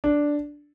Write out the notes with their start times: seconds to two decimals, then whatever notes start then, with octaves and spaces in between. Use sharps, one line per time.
0.04 D4